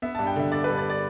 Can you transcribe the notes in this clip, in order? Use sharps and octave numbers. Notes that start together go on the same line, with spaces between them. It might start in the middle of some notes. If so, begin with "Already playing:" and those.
B3 E5
G2 A5
G5
D3 E5
D3 D5
B4
G2
D5
D5